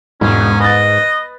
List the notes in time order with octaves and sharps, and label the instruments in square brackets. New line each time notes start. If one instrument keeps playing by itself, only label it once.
[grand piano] E1 [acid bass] G#2 [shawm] C#4
[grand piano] B4 A6 [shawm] D#5